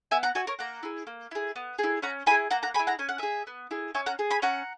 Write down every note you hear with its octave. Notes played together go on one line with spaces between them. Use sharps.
B3 E5 G#5
F#5 A#5
F#4 E5 G#5
A#4 C#5
A#3 F#5 A#5
E4 G#4
A#3
E4 G#4
B3
E4 G#4
C#4 F#5 A#5
E4 G#4 G#5 B5
A#3 F#5 A#5
F#5 A#5
E4 G#4 G#5 B5
F#5 A#5
C#4 G#5
F#5
G#4 E5 G#5
B3
E4 G#4
C#4 E5 G#5
F#5 A#5
G#4
G#5 B5
C#4 F#5 A#5